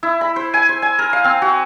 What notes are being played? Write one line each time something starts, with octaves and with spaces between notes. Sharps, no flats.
E4
B5
C5
G#5
C5
G#5
A#4
F5
C4
F#4